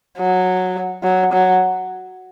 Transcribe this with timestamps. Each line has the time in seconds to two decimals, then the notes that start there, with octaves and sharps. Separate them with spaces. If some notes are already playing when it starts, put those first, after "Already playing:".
0.18 F#3
1.03 F#3
1.33 F#3